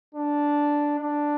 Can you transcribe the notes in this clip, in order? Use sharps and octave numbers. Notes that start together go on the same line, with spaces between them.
D4
D4